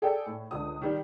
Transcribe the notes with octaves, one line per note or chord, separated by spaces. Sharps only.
G#4 A4 D5 G5
A2
C#2 D3 D#6
D#3 G3